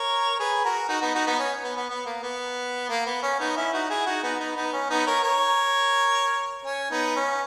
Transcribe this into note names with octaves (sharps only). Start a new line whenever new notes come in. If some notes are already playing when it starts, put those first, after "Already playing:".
Already playing: A#4 C#5
G#4 B4
F#4 A#4
D#4 F#4
B3 D#4
D#4 F#4
B3 D#4
C#4
B3
B3
B3
A#3
B3
A#3
B3
C#4
B3 D#4
C#4 E4
D#4 F#4
E4 G#4
D#4 F#4
B3 D#4
B3 D#4
B3 D#4
C#4
B3 D#4
A#4 C#5
A#4 C#5
C#4
B3 D#4
C#4